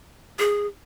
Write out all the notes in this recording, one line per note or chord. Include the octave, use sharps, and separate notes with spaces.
G#4